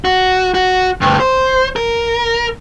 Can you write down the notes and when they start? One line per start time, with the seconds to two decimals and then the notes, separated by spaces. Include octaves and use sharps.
0.05 F#4
0.54 F#4
1.01 D2 G2
1.20 C5
1.76 A#4